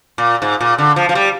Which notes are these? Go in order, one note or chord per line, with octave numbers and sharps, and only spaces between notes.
A#2
G#2
A#2
D3
F3
F3
G3